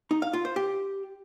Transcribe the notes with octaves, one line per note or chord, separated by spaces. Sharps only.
D#4
F5
F4
C5
G4